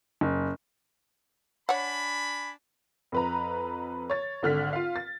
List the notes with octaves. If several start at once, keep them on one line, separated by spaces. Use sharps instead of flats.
F#1
D4 C#5 F#5 G#5 B5
F2 B4 A#5
C#5 A6
G#1 D3 F6 B6
F4 F5
A6